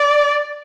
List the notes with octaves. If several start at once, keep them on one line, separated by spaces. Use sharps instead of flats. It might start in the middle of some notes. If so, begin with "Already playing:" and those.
Already playing: D5